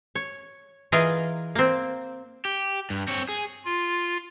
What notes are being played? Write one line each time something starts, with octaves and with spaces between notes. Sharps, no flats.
C#5
E3 F4 G#4 A#4 D#5
A#3 C4
G4
G2
C4 C#5
G#4
F4